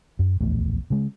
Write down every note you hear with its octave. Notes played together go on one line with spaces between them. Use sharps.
F#2
D1 A#1 E2 A3
C#3 G#3